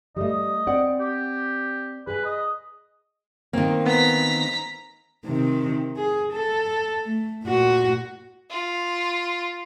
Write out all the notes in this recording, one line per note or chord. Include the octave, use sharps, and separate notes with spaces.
G3 A3 D#5
C4 D5 F#5
G4
G#4 B4 G#5
D#5
D#3 A#3 C4
B3 A#5 B6
C3 D#3
G#4
A4
A3
A#2 F#4
F4